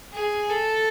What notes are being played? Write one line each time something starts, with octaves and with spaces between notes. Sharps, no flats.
G#4
A4